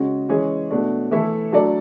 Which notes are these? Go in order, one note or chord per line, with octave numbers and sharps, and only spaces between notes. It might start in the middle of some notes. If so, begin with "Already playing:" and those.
Already playing: C#3 G#3 C#4 F#4
E3 G#3 C#4 G#4 C#5
B2 A3 D4
E3 A3 E4 A4 E5
F#3 A3 D4 A4 D5